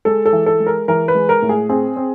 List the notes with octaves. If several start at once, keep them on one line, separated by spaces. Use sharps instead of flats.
G#3 A4
A4
E3
A4
G#3
A#4
E3 A#4
B4
G#3
A#4
A2
G#4
C4 G#4
C4